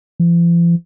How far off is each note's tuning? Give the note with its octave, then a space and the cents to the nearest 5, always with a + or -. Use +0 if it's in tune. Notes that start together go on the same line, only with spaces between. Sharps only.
F3 -45